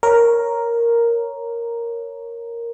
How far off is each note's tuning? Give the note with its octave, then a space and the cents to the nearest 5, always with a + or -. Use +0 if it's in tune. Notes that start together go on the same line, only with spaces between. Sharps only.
A#4 +0 C#5 +0